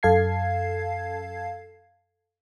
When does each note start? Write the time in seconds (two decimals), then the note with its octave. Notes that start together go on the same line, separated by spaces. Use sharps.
0.03 F#2 A4 F5 A5 G#6 C7